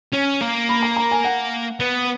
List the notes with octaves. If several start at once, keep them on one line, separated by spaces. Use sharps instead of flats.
C#4
A#3
B5
A#5
A#5
G#5
F#5
B3